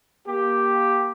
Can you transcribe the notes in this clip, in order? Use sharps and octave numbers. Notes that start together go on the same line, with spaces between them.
A#3 G4